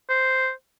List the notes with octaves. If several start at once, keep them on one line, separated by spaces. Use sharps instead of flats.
C5